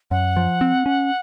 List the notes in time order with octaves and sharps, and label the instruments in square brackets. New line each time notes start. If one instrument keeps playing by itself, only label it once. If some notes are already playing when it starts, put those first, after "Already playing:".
[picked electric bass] F#2 [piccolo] F#5
[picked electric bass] F3
C4
C#4